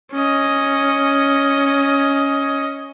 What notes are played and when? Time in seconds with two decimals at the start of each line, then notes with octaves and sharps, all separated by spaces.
0.12 C#4 D#5